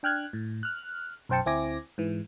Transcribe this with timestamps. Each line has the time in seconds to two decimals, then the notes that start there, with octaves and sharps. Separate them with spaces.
0.03 D4 G5 F6 F#6 G#6
0.33 A2
0.63 F6 F#6
1.29 B1 F#2 C5 G5 A5 C#7
1.46 D2 C4 E4 G#5 D6 A#6
1.98 G#2 E3